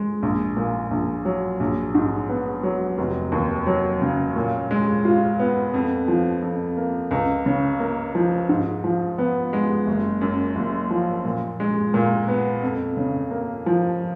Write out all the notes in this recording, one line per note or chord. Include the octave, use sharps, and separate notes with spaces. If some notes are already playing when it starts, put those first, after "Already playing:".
Already playing: G#3
A#1
A#2
A#1
F#3
A#1
G#2
B3
F#3
F1
D#2
F#3
C#3
A#2
G#3
F4
B3
F2
F3
F2
A#3
C#2
C#3
A#3
F3
G#2
F3
B3
G#3
F#1
F#2
F#1
F3
A#2
G#3
A#2
B3
F2
C#3
A#3
F3